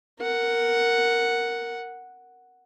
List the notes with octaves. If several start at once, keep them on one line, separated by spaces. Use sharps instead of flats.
A#4 F#5